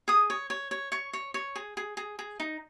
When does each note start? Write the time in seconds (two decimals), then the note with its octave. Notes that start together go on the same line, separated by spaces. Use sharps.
0.08 G#4 D#6
0.30 C#5
0.50 C#5
0.71 C#5
0.92 C#5 C#6
1.13 C#5
1.34 C#5
1.56 G#4
1.77 G#4
1.97 G#4
2.19 G#4
2.40 D#4